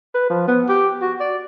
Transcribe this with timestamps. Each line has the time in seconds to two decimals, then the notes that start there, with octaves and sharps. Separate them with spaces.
0.14 B4
0.30 F3
0.47 B3
0.69 G4
1.02 F#4
1.20 D5